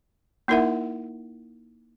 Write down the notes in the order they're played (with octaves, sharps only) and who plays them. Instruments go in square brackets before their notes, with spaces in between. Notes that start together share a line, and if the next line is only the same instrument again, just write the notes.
[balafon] A#3 D#4 E4 A#4 E5 F#5